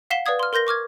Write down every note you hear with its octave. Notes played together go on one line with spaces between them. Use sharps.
F5 F#5 B6 C7 E7 G7
B4 D5 F5 D#6 G#6
C6 F6
A#4 C6 G6 A#6 G7
C#6 D6 F6 G#6